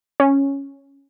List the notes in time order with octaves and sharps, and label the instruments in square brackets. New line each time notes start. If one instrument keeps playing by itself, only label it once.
[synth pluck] C#4